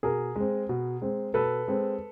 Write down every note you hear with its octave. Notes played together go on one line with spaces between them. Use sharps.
B2 G#4 A#4
G#3 C4
B2
G#3 C4
B2 A4 B4
G#3 C4